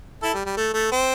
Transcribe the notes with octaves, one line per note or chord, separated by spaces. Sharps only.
E4 A4
G3
G3
A3
A3
C4